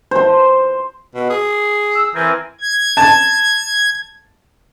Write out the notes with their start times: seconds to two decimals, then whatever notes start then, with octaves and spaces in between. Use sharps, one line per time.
0.11 C5 C6
1.15 B2
1.30 G#4
1.95 E6
2.15 E3 C4 A#4 G#5
2.61 G#6
2.97 A5